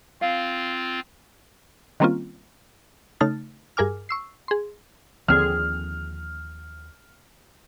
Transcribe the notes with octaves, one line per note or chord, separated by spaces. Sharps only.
C4 F4 F5
D#3 G3 A#3 C4 C#4 F4
C#3 A3 D#4 F6 A6
G2 G#4 A#4 G#5 D6 F6
C#6 E6 C7
G#4 C6
D#2 D3 F3 C4 G#4 F6